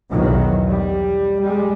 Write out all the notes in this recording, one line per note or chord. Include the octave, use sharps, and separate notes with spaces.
B1 E2 D#3 F#3
G3
G3 G#3